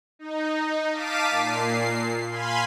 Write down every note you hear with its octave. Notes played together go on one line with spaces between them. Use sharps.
D#4
F5 A5 D6 B6 D#7
A#2 C7
F5 G#5 B5 C6